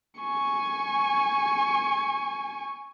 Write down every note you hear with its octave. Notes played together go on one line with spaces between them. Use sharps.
G#5 C#6